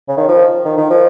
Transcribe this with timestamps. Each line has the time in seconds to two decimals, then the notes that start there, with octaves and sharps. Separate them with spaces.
0.08 C#3
0.18 D#3
0.28 F3
0.65 D#3
0.77 D#3
0.90 F3